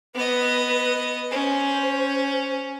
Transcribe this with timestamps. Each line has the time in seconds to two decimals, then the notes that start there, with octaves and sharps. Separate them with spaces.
0.15 B3 B4 D#5
1.31 C#4 C5